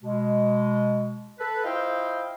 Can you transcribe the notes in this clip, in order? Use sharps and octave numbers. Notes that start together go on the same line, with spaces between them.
B2 G#3
A4 B4
E4 F4 C5 D#5 F5 G5